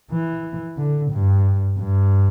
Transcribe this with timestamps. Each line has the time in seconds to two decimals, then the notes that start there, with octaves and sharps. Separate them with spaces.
0.12 E3
0.77 D3
1.11 G2
1.78 G2